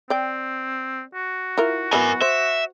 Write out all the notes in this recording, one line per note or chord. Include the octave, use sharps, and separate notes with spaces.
C4 D5 G5
F#4
E4 F4 A#4
F#3 B3 E4 A#4 G#5
C5 E5